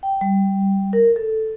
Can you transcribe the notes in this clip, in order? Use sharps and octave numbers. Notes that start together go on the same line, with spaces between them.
G5
G3
A#4
A4